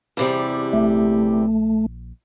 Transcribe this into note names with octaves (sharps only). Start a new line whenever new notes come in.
E2 C3 G3
A#1 A3